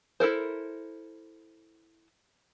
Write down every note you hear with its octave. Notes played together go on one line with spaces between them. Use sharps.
E4 A4 A#4 C5